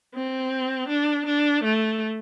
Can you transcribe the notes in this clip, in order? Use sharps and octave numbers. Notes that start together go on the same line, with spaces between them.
C4
D4
D4
A3